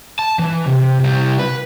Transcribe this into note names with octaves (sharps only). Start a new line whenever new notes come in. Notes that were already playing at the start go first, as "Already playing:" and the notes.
A5
E3
C3
C3 G3
B4